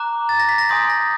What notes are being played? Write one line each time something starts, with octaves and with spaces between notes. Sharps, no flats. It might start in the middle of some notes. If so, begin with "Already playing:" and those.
Already playing: A#5 D6 F#6
A6
A#6
B6
A#6
G#5 C6 D#6 G6 A#6
A#6